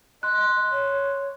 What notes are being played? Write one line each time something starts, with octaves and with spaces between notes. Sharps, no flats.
D#5 C6 F#6
C#5